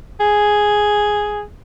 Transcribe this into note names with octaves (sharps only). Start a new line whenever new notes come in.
G#4